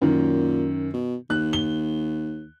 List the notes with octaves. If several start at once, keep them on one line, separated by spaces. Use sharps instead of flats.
F#2 A#2 D#3
B2
D#2 F#6
G7